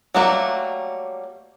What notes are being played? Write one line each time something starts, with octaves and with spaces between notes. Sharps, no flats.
F#3 G3 A3 A#3 F#4